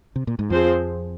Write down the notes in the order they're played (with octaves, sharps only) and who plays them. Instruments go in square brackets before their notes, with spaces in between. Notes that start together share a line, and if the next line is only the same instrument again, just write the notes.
[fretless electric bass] C3
A#2
G#2
[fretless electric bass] F2 [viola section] F3 C4 G#4 C5